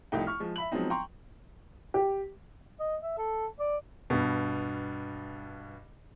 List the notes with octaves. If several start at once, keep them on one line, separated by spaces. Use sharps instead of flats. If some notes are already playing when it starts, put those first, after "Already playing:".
C2 F3 A3 D#4 G5
C#6 F6
F3 G#3
E5 B5 F#7
F3 F#3 G#3 B3 C4 D#4
G5 A#5 C6 C#6
G4
D#5
E5
A4
D5
G2 B2